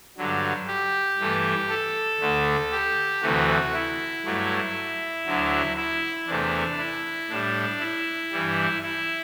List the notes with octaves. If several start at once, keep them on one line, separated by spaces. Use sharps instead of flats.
G2 D3 F#3
G4
G2 E3 A3
A4
D2 D3 A3
G4
D2 C3 E3 A3 F#4
E4
G2 F#3 A3
D2 D3 F#3
E4
E2 C3 E3 A3 D4
E4
A2 G3 D4
E4
G2 E3 G3
E4